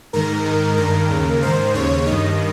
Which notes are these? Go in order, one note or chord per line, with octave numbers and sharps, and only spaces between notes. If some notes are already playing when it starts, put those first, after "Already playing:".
G#2 D#3 A#4
G#2 D#3
G2 D#3 A#4
D#2 C#3
G#2 D#3 C5
D#2 C#3 C#5
G2 D#3 D#5